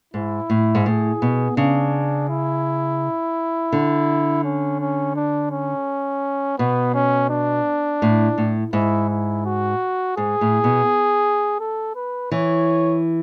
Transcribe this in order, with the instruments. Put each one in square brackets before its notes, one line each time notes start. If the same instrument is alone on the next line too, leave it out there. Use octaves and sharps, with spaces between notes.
[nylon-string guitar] G#2 [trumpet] E4
[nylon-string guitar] A2
G#2
[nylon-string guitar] A2 [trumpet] G#4
[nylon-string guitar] B2
[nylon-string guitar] C#3 [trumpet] D4
[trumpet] E4
[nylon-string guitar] D3
[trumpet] C#4
C#4
D4
C#4
[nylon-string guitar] B2 [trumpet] B3
[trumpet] C#4
D4
[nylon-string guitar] A2
A2
[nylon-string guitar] G#2 [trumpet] E4
[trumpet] E4
F#4
[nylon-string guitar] G#2 [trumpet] G#4
[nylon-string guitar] A2
B2
[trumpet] A4
B4
[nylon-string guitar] E3 [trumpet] C#5